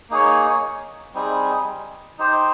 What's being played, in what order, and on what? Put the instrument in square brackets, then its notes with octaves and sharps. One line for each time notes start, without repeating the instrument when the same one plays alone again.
[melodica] A#3 D#4 G#4 C#5
G3 C4 D#4 G#4
D#4 G4 C5